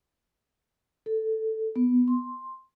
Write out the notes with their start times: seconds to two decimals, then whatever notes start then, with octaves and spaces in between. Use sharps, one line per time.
1.06 A4
1.76 B3
2.08 C6